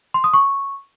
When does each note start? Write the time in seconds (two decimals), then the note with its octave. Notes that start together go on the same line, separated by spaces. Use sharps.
0.14 C6
0.24 D#6
0.33 C#6